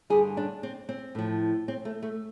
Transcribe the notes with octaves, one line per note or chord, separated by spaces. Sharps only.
G2 D3 G3 G#4
D4
C4
C4
A2 F3
C4
A3
A3